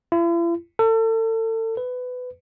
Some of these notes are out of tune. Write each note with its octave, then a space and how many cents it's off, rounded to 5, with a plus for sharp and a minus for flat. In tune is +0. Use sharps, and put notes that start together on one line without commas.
E4 +45
A4 +35
B4 +20